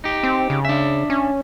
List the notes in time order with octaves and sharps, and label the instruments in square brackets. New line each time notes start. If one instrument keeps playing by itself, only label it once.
[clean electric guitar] D#4 G4
[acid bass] C4
C#3
[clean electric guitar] D4 E5
[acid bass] C#4